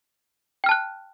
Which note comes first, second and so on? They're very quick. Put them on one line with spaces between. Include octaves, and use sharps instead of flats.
G5 F6 A5 F#6